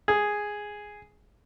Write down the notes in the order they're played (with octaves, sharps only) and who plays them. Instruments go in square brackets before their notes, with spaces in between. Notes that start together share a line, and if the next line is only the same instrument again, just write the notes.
[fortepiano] G#4